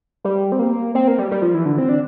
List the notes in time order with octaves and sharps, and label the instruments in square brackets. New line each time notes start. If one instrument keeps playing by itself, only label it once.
[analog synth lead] G3
C4
A#3
C4
A#3
G3
G3
F3
E3
D3
C4
D4